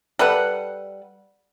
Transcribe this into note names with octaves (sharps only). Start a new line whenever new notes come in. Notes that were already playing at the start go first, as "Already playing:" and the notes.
G3 A4 B4 F#5